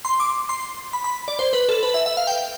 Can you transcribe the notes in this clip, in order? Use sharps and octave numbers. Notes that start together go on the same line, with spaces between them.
C6
D6
C6
B5
B5
D5
C5
B4
A4
B4
E5
E5
F5
G5